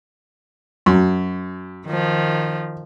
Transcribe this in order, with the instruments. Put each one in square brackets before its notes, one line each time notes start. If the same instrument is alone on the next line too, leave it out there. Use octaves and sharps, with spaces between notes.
[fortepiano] F#2
[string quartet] D#3 F3